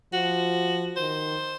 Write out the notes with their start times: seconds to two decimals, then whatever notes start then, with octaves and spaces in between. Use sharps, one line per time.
0.13 F3 F#4
0.97 D#3 C5